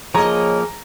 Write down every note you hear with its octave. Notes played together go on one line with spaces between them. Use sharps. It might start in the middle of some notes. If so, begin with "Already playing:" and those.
F3 A#3 G#4 C#5 D#5 A#5